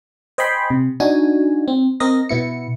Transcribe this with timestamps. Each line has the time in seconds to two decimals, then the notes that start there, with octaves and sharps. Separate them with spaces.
0.38 C5 D#5 G5 G#5 B5 C6
0.70 C3
1.00 D4 D#4 F#4 G#5
1.68 C4
2.00 C4 A#4 D#5 A#6
2.29 B2 B3 E4 C#7